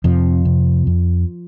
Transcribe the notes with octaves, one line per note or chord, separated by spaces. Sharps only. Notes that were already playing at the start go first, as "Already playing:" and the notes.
F2 C3 F3
C3
F2